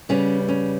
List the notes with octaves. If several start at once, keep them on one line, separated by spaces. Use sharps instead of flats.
C#3 G3 B3 C#4
C#4